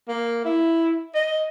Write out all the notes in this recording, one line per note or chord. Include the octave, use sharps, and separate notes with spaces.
A#3
E4
D#5